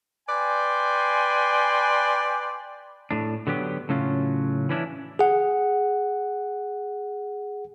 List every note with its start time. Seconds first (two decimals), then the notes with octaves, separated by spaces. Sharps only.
0.29 B4 D5 G5 G#5 C6
3.11 A2 D4
3.47 D3 F#3 B3 G4
3.89 A2 C#3 F#3 C#4 F4
4.69 E3 C#4 D4 E4
5.19 G#4 F#5